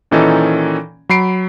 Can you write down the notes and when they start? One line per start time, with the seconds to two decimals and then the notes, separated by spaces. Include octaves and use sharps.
0.11 A#2 D#3 E3 C#4 D#4 A4
1.09 F#3 B5 C7 D7